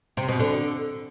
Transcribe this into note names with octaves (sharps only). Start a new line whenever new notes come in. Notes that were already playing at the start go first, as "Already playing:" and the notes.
C3
B2
D3